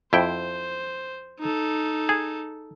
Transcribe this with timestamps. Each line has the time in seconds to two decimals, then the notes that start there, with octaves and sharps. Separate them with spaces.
0.13 F2 E4 C5 G5
1.40 D#4 A4
2.09 G#4